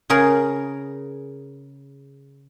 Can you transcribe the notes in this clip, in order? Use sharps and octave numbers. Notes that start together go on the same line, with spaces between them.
C#3 G#4 A#4